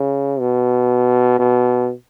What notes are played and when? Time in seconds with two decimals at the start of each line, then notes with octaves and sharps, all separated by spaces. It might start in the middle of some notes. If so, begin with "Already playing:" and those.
Already playing: C#3
0.40 B2
1.39 B2